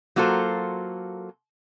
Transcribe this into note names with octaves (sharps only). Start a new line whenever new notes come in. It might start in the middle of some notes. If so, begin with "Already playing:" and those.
F#3 A#3 F4 F#4 A4 C5